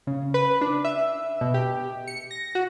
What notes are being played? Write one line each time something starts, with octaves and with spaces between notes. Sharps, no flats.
C#3
B4
D4
E5
B2
G4
C#7
A#6
F#4